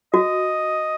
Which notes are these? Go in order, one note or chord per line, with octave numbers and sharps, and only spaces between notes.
F#4 D#5